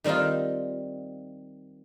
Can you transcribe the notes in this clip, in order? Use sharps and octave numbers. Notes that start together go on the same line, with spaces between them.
D#3 G3 C4 D#4 F4